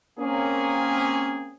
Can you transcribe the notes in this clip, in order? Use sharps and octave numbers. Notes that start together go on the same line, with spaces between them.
A#3 C4 C#4 G#4